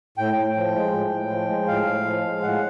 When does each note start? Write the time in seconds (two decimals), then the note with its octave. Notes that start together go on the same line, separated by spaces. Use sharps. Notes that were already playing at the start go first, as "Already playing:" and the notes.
0.18 A2 G5
0.37 A2
0.56 F3
0.75 G#3
0.93 A2
1.11 A2
1.31 F3
1.49 G#3
1.68 A2 F5
1.87 A2
2.06 F3
2.24 G#3
2.42 A2 F#5